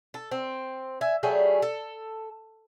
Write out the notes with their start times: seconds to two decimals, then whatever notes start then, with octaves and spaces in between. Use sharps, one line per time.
0.14 A4
0.31 C4
1.01 E5 G#5
1.23 F#3 G3 A3 G#4
1.62 A4